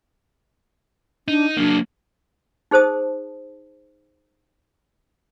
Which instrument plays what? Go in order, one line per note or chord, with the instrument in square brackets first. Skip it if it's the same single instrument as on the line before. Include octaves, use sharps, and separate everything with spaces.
[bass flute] D4 [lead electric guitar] D#4
[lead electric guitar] F#3 A#3 [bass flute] D4
[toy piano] D#4 G#4 C5 A5 D#6